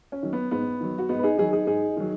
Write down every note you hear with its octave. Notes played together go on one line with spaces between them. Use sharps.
C#4
D#3 F#3
B3
G#2 B3
D#3 F#3
F#4
G#2 B3 D#4
B4
D#4 G#4
D#3 F#3 D#4 G#4
D#4 G#4
G#2 D#4 G#4
D#3 F#3